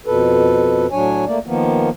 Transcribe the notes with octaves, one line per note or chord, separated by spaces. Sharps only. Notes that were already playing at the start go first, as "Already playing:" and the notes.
F2 B2 A4 B4
A2 F#3 D4 C#5 G#5
A3 A#3 D5
D#3 F3 A#3 B3